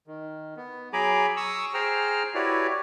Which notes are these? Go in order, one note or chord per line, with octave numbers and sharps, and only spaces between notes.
D#3
B3
F#3 G#4 G#5 A#5 B5 D6
C#6 D#6 E6
G#4 C5 G5 A#5 F6
E4 F#4 G4 B4 C#5 D5